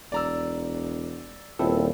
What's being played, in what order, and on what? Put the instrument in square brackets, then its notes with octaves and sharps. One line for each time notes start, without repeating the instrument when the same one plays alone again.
[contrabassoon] E1 [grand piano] D5 A#5 E6
[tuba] D#1 [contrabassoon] A#2 [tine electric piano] C4 E4 A4